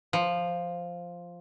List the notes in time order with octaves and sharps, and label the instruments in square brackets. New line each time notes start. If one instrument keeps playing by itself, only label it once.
[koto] F3